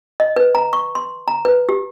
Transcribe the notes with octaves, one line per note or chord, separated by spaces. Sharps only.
D#5
B4
A#5
C#6
C6
A#5
B4
G4